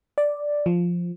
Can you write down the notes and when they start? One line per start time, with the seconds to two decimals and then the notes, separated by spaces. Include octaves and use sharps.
0.18 D5
0.66 F3